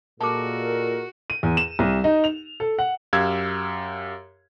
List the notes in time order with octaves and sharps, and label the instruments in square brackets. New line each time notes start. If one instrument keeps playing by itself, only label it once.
[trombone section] A#2 [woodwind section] G#3 A4 A#4 [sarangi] F#4 [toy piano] A5 D6
[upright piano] D#7
E2
E7
C2
D#4
F7
A4
F#5
[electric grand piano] F#2 G4 F5 E6 G#6